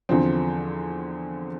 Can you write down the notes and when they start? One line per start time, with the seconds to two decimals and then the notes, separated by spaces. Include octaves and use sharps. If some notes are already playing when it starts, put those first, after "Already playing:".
0.09 E2 D3 F3 C4